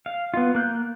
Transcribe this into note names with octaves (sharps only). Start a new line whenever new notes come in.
F5
B3 F4
A#3 F#6 G6